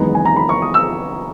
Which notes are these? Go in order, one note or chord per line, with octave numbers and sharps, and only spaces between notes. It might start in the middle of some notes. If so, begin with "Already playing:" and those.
Already playing: F#1 E2 D#3 G#3 B3 A#5
G#5
A#5
B5
C#6
D#6
E6